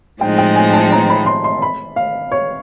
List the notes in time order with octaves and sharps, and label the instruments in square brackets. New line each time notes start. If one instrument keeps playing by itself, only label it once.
[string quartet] A2 F3 G#3 C4 D#4 [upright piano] G5
[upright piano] G5
G#5
A5
A#5
B5
C6
C6
B5
F5
C#5